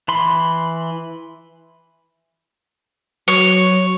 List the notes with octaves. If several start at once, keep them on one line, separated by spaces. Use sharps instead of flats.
E3 B5 C6
F#3 C#5